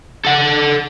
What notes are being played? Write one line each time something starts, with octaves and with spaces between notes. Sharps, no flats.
A4 F#5